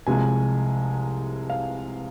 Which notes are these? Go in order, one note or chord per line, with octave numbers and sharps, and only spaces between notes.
C2 C3 F3 G#3 G#5
F5